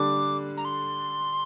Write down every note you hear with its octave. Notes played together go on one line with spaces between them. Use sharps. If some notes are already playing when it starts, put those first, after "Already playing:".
Already playing: D3 G3 D4 D6
A#5
C6